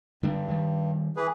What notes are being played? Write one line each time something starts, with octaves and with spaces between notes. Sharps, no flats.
G2 D3 G3 D4
D#3 G3
E3 G#4 B4